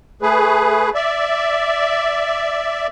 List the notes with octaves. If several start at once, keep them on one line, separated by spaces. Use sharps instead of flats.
A3 G#4 B4
D5 E5